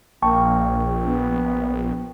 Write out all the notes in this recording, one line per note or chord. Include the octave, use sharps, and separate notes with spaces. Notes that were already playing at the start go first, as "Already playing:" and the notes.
A#1 A#3 G5 A5 C#6
B3